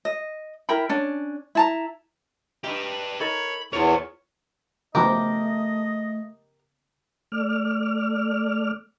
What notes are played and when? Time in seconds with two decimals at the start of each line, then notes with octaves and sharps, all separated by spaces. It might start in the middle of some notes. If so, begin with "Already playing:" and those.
0.05 D#5
0.69 E4 A#4 G5 B5
0.89 C#4 D4
1.55 E4 A5 A#5
2.64 G2 G3 D#4 G4 B4
3.20 D#4 A4 A#4 C#5 B5
3.73 E2 E4 F4 A#4 C5 C#5 C#6
4.95 C#3 F3 A3 B3 G4 A#4 D#5
7.32 A3 D5 F6